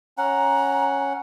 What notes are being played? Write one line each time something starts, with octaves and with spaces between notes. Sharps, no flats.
C#4 F#5 A#5